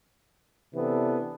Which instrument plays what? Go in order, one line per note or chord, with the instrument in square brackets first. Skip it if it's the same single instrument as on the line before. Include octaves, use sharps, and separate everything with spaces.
[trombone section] C3 E3 B3 D4 A4